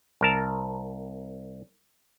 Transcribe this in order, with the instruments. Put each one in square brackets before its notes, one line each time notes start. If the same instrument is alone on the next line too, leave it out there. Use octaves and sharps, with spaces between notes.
[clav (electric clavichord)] C2 A#4 A5